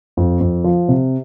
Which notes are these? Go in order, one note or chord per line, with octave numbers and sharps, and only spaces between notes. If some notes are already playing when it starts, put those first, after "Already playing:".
F2
F2
F3
C3